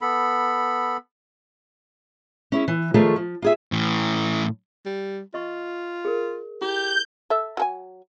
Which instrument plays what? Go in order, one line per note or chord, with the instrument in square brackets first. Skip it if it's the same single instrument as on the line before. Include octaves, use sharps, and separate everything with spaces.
[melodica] B3 A4 B5
[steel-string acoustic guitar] C#4 E4 G#4
E3
D#3 F3 A3 F4 G#4 C#5
F3
F4 G#4 E5
[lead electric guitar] A2 E3
[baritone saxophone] G3
[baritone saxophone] F4 [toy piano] D#5 C#6
[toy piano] G#4 A#4
[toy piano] E4 [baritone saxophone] G4 [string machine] G6
[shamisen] A4 E5
F#3 A4 G#5